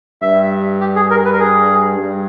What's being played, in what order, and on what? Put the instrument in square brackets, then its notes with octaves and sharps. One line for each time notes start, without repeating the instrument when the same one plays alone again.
[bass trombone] G2 [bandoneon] E5
[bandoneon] G4
G#4
A#4
B4
A#4
G#4
[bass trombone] G2